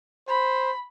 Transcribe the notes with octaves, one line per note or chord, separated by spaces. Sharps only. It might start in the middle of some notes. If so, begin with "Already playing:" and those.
C5 B5